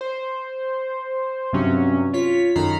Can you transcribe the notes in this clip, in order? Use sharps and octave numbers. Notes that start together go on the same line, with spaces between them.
C5
G2 C3 F#3 C#4
F4 C#5 B6
F#2 D#3 A4 A#5 B5 C7